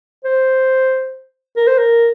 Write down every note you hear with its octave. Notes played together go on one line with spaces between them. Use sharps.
C5
A#4
C5
A#4